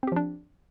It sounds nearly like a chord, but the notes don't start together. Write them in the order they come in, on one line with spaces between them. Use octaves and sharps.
C4 G4 F3 D4